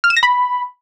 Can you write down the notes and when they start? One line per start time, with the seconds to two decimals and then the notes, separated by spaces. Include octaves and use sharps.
0.04 F6
0.10 E7
0.16 A#6
0.23 B5